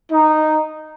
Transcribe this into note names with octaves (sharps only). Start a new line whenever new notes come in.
D#4